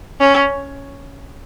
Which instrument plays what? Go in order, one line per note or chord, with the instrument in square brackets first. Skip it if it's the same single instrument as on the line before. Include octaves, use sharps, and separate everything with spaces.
[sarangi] C#4